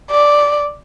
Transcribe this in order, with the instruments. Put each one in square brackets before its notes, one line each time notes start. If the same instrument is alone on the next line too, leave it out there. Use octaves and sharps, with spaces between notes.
[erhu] D5